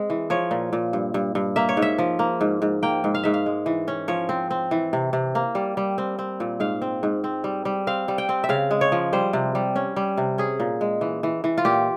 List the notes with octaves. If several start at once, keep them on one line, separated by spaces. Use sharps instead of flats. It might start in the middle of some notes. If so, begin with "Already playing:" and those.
Already playing: G#3 C4
E3
F3 C#5
A#2
A#2
G2
G2
G2
A#3 E5
C#5
G#2
E5
F3
A#3
G#2
G#2
A#3 G5
G#2
F5
G#2 E5
F5
G#3
E3
C#4
F3 C#5
C4
C4
E3
C3
C3
A#3
G3
G3
C4
C4
A#2
G#2 F5
C4
G#2
C4
G3
G3
C4 F5
G3
G5
C4
E5
C#3 F5
G#3
C#5
F3
G3 C5
C3
G3
C#4
G3
C3
C#4 G#4
A#2
G#3
E3
E3
E3
F4
A#2 G4